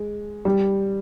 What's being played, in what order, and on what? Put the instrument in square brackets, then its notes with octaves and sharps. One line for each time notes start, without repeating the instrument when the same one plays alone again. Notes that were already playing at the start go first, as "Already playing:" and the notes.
Already playing: [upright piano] G#3
G3